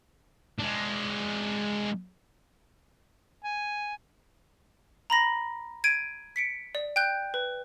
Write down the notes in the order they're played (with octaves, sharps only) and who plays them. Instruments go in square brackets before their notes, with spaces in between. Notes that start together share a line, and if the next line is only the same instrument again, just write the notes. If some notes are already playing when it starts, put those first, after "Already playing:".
[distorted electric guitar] G#3 D4
[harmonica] G#5
[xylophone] A#5 B5 A#6
G#6 D7 D#7
B6 C#7 D7
D5
G5 F#6 G6
B4